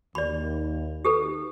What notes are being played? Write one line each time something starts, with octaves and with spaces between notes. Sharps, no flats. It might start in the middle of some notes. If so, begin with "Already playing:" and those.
D#2 D5 B5
D#2 G4 A4 B4